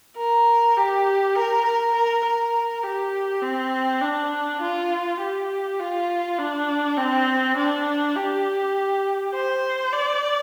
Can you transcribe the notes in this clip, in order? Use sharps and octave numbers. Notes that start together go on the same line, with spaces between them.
A#4
G4
A#4
A#4
A#4
A#4
G4
C4
D4
F4
G4
F4
D4
C4
D4
G4
C5
D5